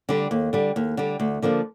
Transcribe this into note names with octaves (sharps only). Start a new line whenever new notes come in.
D3 G3
D#2
D3 G3
D#2
D3 G3
D2
D3 F3 A#3 D4